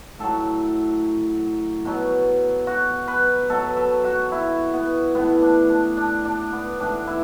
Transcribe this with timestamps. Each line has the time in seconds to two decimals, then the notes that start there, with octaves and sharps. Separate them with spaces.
0.19 A2 F#3 A4
1.85 B2 F#3
2.67 F#4
3.08 B4
3.49 B2 F#3 A4
3.76 A4
4.04 F#4
4.32 E4
4.74 B3
5.15 A2 E3 B3
5.42 D4
5.70 D4
5.97 D4
6.25 D4
6.52 B3
6.79 A2 E3 D4
7.07 E4